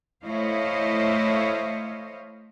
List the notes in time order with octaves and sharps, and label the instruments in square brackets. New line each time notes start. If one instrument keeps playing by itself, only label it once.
[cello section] A3 E4 C5 C#5 D#5 F5